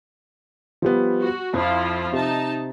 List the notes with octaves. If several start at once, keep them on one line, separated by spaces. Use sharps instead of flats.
F3 G3 B3
F#4
F2 F3 E4 F4
C3 D#4 A5